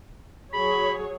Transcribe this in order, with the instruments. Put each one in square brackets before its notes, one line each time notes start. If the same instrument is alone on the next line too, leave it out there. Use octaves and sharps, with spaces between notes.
[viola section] F#3 G#4 C#5 [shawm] B5